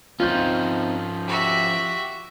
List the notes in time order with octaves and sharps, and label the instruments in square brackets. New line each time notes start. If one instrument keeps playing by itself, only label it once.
[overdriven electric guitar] F3 C#4 [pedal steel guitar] C4 D#4 [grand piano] F4 G6
[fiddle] F#4 E5 [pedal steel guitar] G4